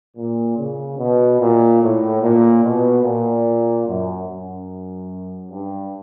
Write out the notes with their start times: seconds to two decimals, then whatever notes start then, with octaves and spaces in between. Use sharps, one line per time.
0.16 A#2
0.58 C#3
0.98 B2
1.41 A#2
1.81 A2
2.22 A#2
2.64 B2
3.04 A#2
3.87 F#2
4.27 F#2
5.50 G2